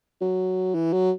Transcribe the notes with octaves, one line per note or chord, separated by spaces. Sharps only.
F#3
E3
F#3